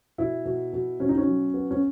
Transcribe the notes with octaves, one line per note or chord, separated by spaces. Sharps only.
B2 E4
B2
B2
B2 C#4
D#4
C#4
F#3
B3
C#4